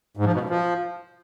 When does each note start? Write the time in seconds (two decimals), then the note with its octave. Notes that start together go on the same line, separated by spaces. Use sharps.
0.17 G#2
0.25 F3
0.33 B2
0.41 F#2
0.49 F3